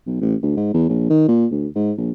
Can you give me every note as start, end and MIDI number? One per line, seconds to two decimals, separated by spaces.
0.07 0.20 35
0.21 0.35 33
0.43 0.56 38
0.57 0.71 44
0.74 0.85 40
0.89 1.05 34
1.10 1.27 51
1.28 1.46 46
1.51 1.67 38
1.76 1.92 44
1.98 2.11 34